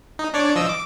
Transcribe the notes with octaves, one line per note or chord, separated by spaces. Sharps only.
D#4
D4 C#5 D5
F3 D#5 E6
D6